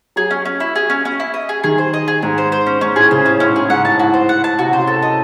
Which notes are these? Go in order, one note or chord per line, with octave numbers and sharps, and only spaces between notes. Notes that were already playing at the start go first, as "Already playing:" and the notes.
F#3 G#4
C#4
C#4
E4
G#4
C#4
C#4
E4
D#5
G#4
D#3 G#4
C5
D#5
G#4
G#2 G#4
C5
C5
C#4
G#2 C#4
A2 G#4
C#3 C5
A2 C#4
A2 C#4
G#2
A2 G#4
G#2 F#5
A2 A5
A2 F#4
C5
F#5
A5
C3 F#4
C#3
C5
A4
D#5